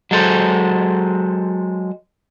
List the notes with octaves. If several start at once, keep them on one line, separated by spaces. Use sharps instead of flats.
F#3 G#3 A4 C5